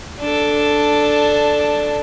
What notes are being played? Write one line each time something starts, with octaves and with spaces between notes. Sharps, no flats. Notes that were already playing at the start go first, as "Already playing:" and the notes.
D4 A4